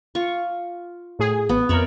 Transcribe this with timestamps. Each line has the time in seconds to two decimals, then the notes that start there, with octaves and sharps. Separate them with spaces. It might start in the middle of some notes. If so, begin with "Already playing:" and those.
0.15 F4 C#6
1.19 A2 G#4
1.49 A1 B3
1.69 F2 A#4 C#5 D5 E5